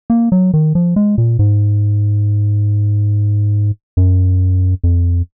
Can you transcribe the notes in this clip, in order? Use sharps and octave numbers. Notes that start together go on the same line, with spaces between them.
A#3
F#3
D#3
F3
G#3
A#2
G#2
F#2
F2